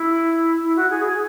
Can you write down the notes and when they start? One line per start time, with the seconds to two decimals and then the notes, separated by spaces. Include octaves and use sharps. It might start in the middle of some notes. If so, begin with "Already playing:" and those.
Already playing: E4
0.63 E4
0.76 F#4
0.91 G#4
1.05 G#4